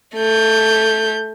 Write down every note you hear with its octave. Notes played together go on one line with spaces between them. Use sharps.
A3 G6